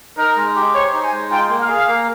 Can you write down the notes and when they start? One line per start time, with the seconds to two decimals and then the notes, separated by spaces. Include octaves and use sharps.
0.17 D#4 A#4
0.36 G#3
0.55 G4
0.74 C5 C#5
0.93 D#4
1.03 G#5
1.12 G#3
1.31 F4 G5
1.49 A#3
1.59 F5
1.68 G#4
1.88 A#3